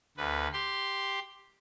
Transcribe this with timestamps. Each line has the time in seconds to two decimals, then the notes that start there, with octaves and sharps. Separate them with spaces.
0.17 D2 B4
0.53 G4 C6